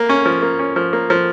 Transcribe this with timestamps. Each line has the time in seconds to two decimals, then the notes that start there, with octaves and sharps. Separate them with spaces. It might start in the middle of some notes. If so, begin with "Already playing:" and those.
Already playing: A#3
0.09 C#4
0.26 F3
0.42 A#3
0.59 C#4
0.76 F3
0.93 A#3
1.10 F3